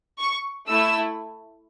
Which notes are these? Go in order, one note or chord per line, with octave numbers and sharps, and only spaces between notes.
C#6
A3 E4 A4 E6